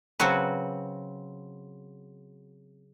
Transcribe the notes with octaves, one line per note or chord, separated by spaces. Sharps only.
C#3 F#3 C4 F#4 B4